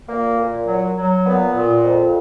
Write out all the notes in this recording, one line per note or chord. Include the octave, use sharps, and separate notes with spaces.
A#2 A#3
A#2
F#3
F#3
A#2 B3
A#2
F2